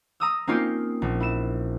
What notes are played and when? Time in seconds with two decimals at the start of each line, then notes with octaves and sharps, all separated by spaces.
0.20 A#5 D#6 E6
0.47 A#3 C4 C#4 D#4 F4 G4
1.02 A#1
1.20 E4 E7